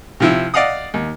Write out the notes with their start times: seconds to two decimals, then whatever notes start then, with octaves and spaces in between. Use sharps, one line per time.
0.20 C3 F3 E4
0.54 D5 D#5 F5 F#5 D#6
0.94 D#2